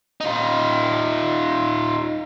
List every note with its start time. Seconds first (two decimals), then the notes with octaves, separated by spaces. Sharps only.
0.21 D#4 F4